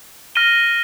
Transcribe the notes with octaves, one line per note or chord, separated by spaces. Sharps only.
F6 A#6 D#7 G7